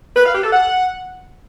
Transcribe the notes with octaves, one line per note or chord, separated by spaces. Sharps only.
B4
F5
G4
A4
F#5